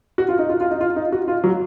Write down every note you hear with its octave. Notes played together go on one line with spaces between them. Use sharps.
F#4
F4
D#4
F4
F4
D#4
F4
D#4
F#4
F4
F#3